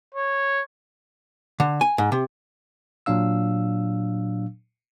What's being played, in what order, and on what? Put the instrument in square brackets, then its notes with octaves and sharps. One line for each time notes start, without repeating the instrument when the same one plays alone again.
[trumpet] C#5
[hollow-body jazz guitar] D3
G#5
G#2
C3
[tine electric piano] A#2 F#3 D4 F5 E6